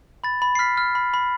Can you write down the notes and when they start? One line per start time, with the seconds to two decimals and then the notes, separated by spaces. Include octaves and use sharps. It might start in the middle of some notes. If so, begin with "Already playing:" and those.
0.24 B5 A6
0.42 B5
0.55 C7
0.59 F6 B6
0.77 F6
0.95 B5
1.14 B5